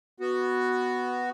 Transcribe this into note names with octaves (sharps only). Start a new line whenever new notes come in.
B3 F#4